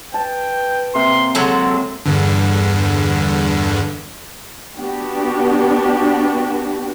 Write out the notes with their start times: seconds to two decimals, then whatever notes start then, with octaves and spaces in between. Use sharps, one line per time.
0.14 B4 G5 A5
0.95 C3 A#3 C6
1.35 D3 F#3 G#3 A4
2.06 E2 G2 D3
4.77 B3 D4 F#4 G4